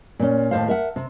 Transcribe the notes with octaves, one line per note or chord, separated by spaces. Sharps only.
A#2 C#4
D#2 A2 G#3 A3 C5 F5
A#4 E5 F#5
C3